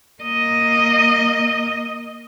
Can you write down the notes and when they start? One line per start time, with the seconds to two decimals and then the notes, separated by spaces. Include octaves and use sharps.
0.22 A#3 D#5